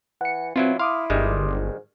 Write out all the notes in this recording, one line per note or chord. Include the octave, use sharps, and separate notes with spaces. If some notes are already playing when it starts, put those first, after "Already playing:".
E3 F#5 C#7
B2 F#3 C4 E4 F4
E4 F5 C6 D6 D#6
G1 D#3 G3 G#3
G#2